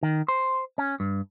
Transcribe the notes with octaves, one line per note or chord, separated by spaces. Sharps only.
D#3
C5
C#4
G2